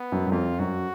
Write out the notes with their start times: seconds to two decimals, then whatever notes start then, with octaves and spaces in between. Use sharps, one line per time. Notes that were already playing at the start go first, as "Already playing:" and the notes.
Already playing: B3
0.12 F#2
0.26 F#2
0.31 F2 F4
0.59 F#2 F#4